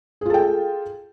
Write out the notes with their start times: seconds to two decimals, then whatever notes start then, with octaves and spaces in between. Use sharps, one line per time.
0.21 G#4
0.26 F4
0.30 A4
0.34 G5